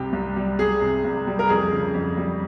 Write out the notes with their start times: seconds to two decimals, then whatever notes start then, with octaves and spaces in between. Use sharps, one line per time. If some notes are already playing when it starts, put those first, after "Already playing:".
Already playing: C2 C3 G4
0.13 C2
0.36 G3
0.59 C2 G#4
0.81 C3
1.04 C2
1.27 G3
1.39 A#4
1.49 F2 G#4
1.72 C#3
1.94 F2
2.17 G3